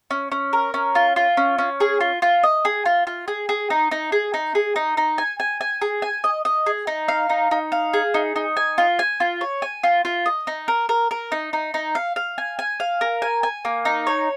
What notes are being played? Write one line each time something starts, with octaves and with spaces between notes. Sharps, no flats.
C#4
C#4
A#4
C#4
F4
F4
C#4
C#4
G#4
F4
F4
D#5
G#4
F4
F4
G#4
G#4
D#4
D#4
G#4
D#4
G#4
D#4
D#4
G#5
G#5
G#5
G#4
G#5
D#5
D#5
G#4
D#4
F5
D#4
D#4
F5
G#4
D#4
D#4
G#5
F4
G#5
F4
C#5
G#5
F4
F4
D#5
D#4
A#4
A#4
A#4
D#4
D#4
D#4
F5
F5
G#5
G#5
F5
A#4
G#5
G#5
A#3
D#4
C#5